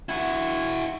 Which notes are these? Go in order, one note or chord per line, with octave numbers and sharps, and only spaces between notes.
E4 F#4